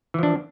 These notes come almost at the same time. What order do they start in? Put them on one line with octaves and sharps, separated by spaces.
E3 F3 D4